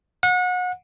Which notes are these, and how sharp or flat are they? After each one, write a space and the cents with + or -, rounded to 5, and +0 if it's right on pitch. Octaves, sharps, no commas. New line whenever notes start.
F#5 -30